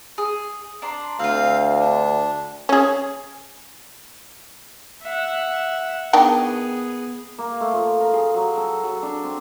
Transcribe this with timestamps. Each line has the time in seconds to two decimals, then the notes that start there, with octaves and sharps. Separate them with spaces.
0.18 G#4
0.82 D4 A#5 C6
1.19 D2 C4 F4 F5
1.80 D4
2.69 C#4 G#4
5.03 E5 F#5
6.13 D#3 B3 D4 G#4 G5
7.38 A#3
7.61 A3
7.73 F3
8.00 A#4
8.13 G#4
8.34 F#3
8.57 A4
8.83 F#3
9.03 D4
9.24 C4